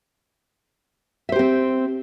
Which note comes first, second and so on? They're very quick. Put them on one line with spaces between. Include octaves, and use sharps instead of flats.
E5 C5 G4 C4